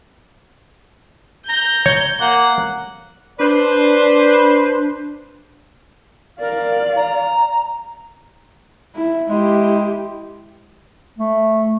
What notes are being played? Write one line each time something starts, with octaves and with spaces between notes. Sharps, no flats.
A#5 G6
C#5
A#3 F#5
D4 B4 C5 D5
A#4 D5 F5
A#5
E4
G#3 E4 G4
A3